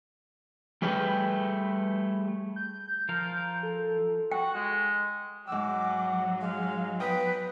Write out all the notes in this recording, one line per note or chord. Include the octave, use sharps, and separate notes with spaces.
G3 A3 G#4 B4 G5
G6
F3 A#4 F5
A4
F#4 G5
G#3
G#2 F#3 F#5 D6 E6
G#3 F5
B3 B4 G5 D#6